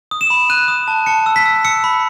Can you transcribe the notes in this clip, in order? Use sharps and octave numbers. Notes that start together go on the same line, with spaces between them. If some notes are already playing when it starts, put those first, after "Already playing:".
D#6
E7
B5
F#6 D#7
D#6
A5
A5 C#7
E6
B6
E6
E6 C#7
B5